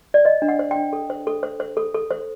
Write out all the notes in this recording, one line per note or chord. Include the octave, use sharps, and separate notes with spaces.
D5
C5 D#5
D4
F#5
C5
D4 G5
A4
C5
A4
C5
C5
A4
A4
C5